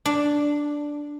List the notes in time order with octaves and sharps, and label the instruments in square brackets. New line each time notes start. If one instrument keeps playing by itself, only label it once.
[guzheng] D4